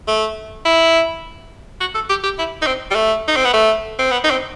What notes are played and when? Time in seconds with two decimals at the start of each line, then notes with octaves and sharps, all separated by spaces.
0.08 A3
0.65 E4
1.80 F#4
1.95 A4
2.10 G4
2.24 G4
2.38 E4
2.62 D#4
2.67 C4
2.91 G3
2.95 A3
3.28 D#4
3.36 C4
3.45 B3
3.54 A3
3.99 C4
4.11 B3
4.24 D#4
4.31 C4